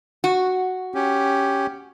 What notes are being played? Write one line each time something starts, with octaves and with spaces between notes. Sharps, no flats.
F#4
C#4 G4